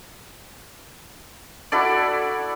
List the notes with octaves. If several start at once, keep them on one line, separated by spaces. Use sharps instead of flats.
E4 F#4 A4 D5